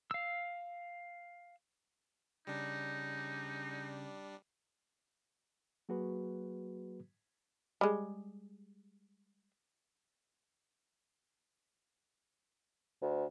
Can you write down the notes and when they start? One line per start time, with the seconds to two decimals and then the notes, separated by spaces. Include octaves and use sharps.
0.11 F5 E6
2.47 C#3 G3 D4 D#4
5.89 F#3 A#3 F#4 G#4 B4
7.81 G3 G#3
13.02 D2